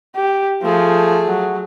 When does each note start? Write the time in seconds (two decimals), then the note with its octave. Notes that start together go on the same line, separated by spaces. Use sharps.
0.16 G4
0.63 F3 A3 G#4
1.26 F#3